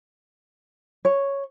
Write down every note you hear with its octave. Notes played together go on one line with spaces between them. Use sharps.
C#5